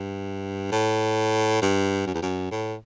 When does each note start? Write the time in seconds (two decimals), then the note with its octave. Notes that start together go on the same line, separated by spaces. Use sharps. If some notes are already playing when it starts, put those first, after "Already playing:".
Already playing: G2
0.72 A2
1.62 G2
2.07 F#2
2.14 E2
2.22 F#2
2.51 A2